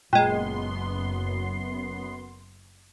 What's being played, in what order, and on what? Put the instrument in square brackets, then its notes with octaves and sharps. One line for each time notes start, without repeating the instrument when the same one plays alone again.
[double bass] F#1 [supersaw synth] F#2 B3 C6 [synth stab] A#2 G#3 [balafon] G5